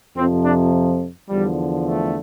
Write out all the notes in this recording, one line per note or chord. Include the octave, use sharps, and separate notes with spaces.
F2 C3 F3 C4
D4
E2 D3 F3 G3
A3